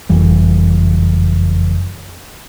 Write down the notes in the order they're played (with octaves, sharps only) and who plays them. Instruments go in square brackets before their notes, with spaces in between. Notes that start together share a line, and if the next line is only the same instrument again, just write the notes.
[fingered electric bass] F#1 F2 E3 G3